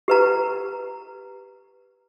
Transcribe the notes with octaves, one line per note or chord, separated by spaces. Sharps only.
G4 B4 A#5